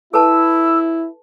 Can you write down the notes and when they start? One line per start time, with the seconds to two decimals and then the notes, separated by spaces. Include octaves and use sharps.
0.14 E4 A4 B4 A5 E6